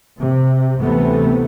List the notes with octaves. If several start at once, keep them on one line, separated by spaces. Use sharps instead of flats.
C3
D2 C3 E3 A3 B3